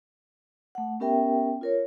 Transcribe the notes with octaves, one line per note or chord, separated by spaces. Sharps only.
A3 F#5
B3 C#4 G4 A#4 E5 G5
F4 A#4 C#5